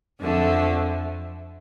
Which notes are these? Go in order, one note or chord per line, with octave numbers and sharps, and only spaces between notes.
F2 D3 A3